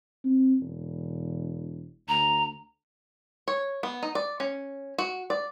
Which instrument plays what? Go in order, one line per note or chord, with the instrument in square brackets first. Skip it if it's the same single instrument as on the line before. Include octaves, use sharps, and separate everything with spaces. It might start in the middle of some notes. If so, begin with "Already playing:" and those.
[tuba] C4
E1
[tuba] D2 [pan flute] A#5
[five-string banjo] C#5
B3
D#4
D5
C#4
F#4
D5